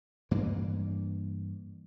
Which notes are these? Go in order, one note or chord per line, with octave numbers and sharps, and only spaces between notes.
G2 E3 A#3